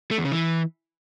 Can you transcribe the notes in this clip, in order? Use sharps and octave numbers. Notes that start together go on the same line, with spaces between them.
A3
E2
C#3
E3